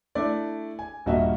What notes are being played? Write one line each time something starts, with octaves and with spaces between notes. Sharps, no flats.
A3 D4 E4 D5
G#5
D#1 G2 A#3 F#4 D#5 E5